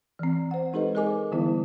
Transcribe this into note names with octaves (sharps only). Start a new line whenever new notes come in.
E3 C4
C5 F#5
G#3 D#4 G4 A4 B4 D#5
G#4 A#4 D#5 G#5 D6
D3 E3 G3 B3 E4